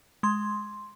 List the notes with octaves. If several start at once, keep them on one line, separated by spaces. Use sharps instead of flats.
G#3 C6